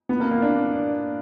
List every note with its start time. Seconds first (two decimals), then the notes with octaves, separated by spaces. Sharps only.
0.09 B3
0.20 A#3
0.31 A#3
0.42 D4